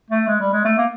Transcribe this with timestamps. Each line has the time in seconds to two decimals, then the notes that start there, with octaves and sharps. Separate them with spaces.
0.10 A3
0.27 G#3
0.40 G3
0.53 G#3
0.65 A3
0.78 A#3